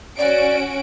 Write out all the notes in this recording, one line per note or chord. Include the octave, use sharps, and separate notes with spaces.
C#4 F#4 D5 D7